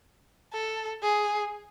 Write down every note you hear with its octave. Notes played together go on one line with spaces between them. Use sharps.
A4
G#4